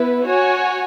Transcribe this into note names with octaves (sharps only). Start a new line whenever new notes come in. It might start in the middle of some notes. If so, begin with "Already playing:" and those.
Already playing: B3 E4 B4
F#4 C#5 G#5